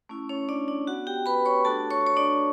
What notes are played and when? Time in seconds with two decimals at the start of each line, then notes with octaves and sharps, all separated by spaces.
0.09 A3 C#4 E4
0.29 C#4 C#5
0.49 D4 D5
0.68 D4 D5
0.87 B3 F#4 F#5
1.07 G4 G5
1.26 B4 B5
1.45 C#5 C#6
1.65 A3 D4 F#4 A4 A5
1.91 C#5 C#6
2.07 C#5
2.16 D4 D5